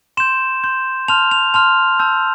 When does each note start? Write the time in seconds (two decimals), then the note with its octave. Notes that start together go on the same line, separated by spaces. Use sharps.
0.17 C6 G6 E7
0.64 C6 G6
1.08 A5 C6 F6 F7
1.31 F7
1.54 A5 C6 F6 F7
1.99 A5 E6 G6